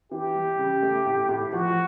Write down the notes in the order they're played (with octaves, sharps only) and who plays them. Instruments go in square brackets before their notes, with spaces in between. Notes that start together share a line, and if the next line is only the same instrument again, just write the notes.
[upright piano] E3 [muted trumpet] G4
[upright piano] G3
C#3
A3
A2
A2
[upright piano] F3 [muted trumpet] F#4